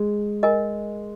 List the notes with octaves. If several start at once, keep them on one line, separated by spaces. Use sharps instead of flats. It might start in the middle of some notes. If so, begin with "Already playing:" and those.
Already playing: G#3
A#4 D#5 G#5